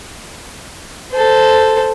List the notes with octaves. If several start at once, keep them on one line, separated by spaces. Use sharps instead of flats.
A4 C5